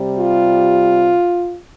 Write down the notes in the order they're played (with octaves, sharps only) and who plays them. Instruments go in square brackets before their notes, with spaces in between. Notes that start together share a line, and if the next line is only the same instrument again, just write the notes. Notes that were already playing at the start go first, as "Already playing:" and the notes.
Already playing: [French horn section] C3 G3
F4